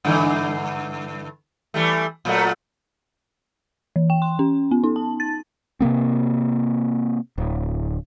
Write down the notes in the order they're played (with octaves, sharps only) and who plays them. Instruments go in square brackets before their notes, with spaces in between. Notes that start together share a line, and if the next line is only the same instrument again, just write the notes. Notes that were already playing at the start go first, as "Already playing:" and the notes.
[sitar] G2 D3 E3
E3 G3 A3
A#2 F#3 A3
[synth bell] E3
G5
C6
C#4
B3
D#4
A5
A6
[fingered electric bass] C3 F#3 A#3 C4
D1